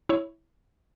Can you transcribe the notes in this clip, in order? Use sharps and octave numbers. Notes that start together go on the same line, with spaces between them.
E4 C#5